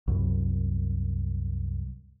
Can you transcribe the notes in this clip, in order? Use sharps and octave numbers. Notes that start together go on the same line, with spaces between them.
C2 F#2